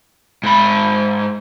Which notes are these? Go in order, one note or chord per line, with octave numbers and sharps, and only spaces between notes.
G#2 B5